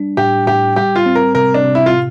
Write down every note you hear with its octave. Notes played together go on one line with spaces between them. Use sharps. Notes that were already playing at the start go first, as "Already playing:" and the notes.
Already playing: G3 D4
A2 G4
A2 G4
G3 G4
F4
C4
A#4
C3 A#4
D4
C3
E4
F4
A2